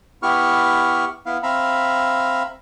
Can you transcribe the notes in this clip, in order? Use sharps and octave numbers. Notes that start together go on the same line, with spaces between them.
B3 E4 G4 C#6 F6
B3 E4 F5
C4 E5 F5 A#5 B5